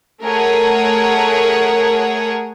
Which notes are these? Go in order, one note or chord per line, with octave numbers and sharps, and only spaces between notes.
A3 G#4 A#4 C#5 F#5